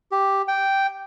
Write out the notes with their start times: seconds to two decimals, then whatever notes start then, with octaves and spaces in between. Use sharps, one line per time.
0.12 G4
0.48 G5